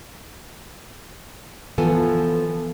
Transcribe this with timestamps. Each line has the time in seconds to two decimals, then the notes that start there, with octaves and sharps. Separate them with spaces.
1.78 E3 F3 B3 A4 G#5 A5